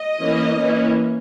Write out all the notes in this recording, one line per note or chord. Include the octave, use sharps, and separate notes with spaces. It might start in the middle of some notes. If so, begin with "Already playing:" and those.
Already playing: D#5
E3 A#3 C#4
E3 A#3 C#4